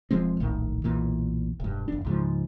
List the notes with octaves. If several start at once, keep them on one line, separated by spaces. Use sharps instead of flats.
E1 F3 G#3 C4
D1 A#1 A2 D#3
B1 E2 A#2 E3
E1 G2
F#1 E2 D4
C#2 G#2 F3